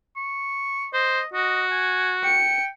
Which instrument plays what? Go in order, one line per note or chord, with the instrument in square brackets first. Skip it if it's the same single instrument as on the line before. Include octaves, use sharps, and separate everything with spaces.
[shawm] C#6
[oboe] C5 [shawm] D#5
[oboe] F#4 [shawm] D#5
[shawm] G#5
[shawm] G5 [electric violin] C#7